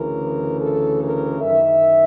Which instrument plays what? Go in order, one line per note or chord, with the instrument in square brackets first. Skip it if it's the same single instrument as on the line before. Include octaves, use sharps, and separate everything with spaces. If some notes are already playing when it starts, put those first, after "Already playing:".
Already playing: [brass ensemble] D2 C#3 E3 A#4
A4
A#4
F#2 D#3 E5